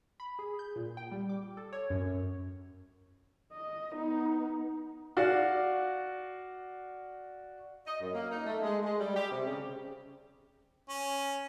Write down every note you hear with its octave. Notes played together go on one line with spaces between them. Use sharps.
B5
G#4
G6
A#2
G5
G3
D6
A4
C#5
F#2
D#5
B3 D#4
F#4 D5 F5
D#5
F#2
A#3
D#4
A3
G#3
G#3
G3
G4
C3
C#3
C#4